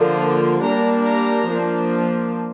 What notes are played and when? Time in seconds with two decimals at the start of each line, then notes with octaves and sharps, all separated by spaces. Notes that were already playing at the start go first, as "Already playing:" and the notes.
Already playing: D3 F3 A#3 D4
0.65 G3 A#3 D4 A#5
1.07 A#5
1.49 F3 A#3 D4